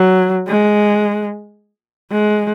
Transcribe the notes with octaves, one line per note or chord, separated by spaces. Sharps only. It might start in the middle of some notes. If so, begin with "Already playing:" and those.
Already playing: F#3
G#3
G#3